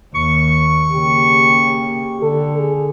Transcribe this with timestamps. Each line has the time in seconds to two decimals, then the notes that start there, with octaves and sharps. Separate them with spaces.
0.15 D#2 C#6
0.92 C#3 A#3 G4
2.22 D3 A4
2.58 G#4